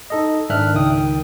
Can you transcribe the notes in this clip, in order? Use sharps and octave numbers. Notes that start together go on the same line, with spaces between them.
D#4 A4 D#5
G#2 D#3 D4 E5 F6 F#6
C#2 D#3 G5 D#6